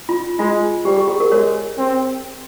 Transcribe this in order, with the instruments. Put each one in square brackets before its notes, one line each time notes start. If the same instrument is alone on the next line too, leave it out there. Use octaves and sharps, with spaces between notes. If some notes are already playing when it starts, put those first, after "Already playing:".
[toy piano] F4
[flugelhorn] G#3 [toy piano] F4
[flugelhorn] G3 [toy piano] G4
[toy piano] G#4
G#4
A#4
[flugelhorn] G#3 [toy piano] A#4 C#5
[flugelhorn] C4